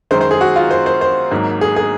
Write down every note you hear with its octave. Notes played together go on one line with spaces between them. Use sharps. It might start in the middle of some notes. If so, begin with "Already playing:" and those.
F#2 D#3 G#3 C5
C5
G#4
F#4
F4
C5
C5
C5
G#1 G#2 F#3 A#3
G#4
G#4